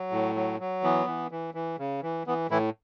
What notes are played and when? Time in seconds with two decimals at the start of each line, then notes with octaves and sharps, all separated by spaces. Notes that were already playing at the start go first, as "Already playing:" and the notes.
Already playing: F#3
0.12 A2
0.35 F#3
0.60 F#3
0.83 E3 B3
1.07 E3
1.31 E3
1.54 E3
1.79 C#3
2.02 E3
2.27 E3 B3
2.50 A2 E3 E4